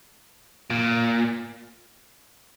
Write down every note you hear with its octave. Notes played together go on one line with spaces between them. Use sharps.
A#2